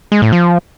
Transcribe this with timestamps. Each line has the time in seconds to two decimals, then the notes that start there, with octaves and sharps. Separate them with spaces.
0.12 G#3
0.22 A2
0.32 F3